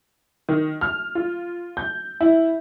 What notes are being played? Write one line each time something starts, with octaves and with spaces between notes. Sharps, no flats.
D#3
F6
F4
G6
E4